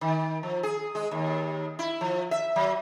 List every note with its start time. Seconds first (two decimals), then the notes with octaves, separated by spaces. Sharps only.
0.01 D#3
0.43 F3
0.63 G#4
0.95 G#3
1.11 D#2
1.79 E4
2.01 F3
2.31 E5
2.56 F#3